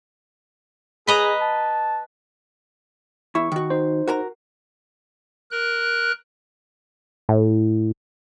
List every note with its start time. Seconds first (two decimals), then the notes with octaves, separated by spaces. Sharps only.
1.07 G#4 B4 D#5 A#5
1.41 A5
3.35 E2 E4 C#6
3.52 D#3 F#4
3.70 D#4 C5
4.08 F#4 A#4 A#5
5.51 A#4 F#6
7.29 A2